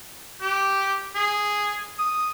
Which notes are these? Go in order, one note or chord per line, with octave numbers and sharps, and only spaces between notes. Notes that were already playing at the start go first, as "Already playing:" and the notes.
G4
G#4
D#6